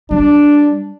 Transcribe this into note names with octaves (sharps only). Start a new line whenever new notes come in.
G3 D4